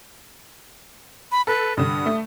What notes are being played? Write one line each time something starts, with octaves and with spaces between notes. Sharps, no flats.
B5
A4 B4
G2 D3 D#6
A3